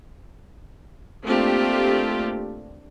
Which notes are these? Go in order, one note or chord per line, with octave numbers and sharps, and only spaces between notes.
A3 A#3 C4 D4 F4 G4